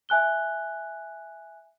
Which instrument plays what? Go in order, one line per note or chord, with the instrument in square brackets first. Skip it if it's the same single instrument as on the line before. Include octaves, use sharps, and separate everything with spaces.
[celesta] E5 G#5 F#6 G7